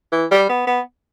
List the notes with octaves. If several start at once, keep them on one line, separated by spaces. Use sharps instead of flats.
E3
G3
B3
B3